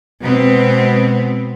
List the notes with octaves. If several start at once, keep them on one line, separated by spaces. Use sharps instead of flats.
B2 G#3 B3 C4